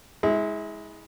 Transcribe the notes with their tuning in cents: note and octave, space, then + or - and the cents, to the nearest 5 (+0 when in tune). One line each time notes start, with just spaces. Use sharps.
G#3 +0 E4 -35